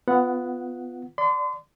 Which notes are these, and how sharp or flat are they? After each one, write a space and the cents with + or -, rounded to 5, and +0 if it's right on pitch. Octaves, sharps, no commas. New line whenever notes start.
B3 +15 F4 +0 F#5 +0
D5 +0 C6 -40